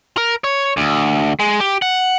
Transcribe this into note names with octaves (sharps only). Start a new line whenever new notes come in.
A#4
C#5
D2
G#3
G4
F#5